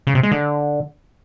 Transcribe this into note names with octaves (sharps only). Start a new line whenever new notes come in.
C#3
C3
G#3
D3